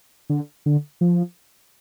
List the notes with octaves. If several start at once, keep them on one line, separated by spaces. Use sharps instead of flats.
D3
D3
F3